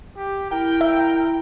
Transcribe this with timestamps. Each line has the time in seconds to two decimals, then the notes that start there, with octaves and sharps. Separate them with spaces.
0.17 G4
0.51 E4 A#4 G5
0.81 E5